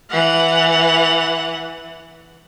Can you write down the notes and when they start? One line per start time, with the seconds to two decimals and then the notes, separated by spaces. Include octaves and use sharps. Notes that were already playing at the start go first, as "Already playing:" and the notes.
0.10 E3 F#5